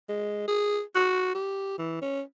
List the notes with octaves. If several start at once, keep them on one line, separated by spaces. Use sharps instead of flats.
G#3
G#4
F#4
G4
E3
C#4